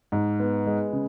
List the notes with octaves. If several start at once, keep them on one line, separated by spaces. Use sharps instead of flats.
G#2
B3
G#3
C#3